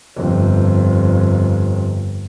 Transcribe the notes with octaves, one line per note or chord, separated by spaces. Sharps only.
G1 F2